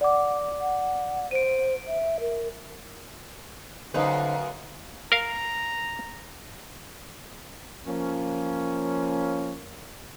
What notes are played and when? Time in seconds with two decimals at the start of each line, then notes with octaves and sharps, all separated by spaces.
0.01 D5 F#5 D6
0.61 F#5
1.31 C5 D7 D#7
1.88 E5
2.20 A#4
3.94 F#2 D3 C#4 D#4 B4 C5 F5
5.12 A#4 F5 A#5
7.87 F3 A#3 C#4